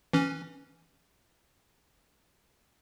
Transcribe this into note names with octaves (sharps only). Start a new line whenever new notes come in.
E3 C#4